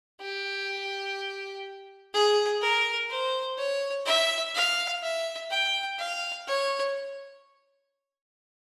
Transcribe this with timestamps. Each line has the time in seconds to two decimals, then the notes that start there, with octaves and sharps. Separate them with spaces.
0.21 G4
2.14 G#4
2.61 A#4
3.10 C5
3.58 C#5
4.05 E5
4.54 F5
5.03 E5
5.50 G5
5.99 F5
6.47 C#5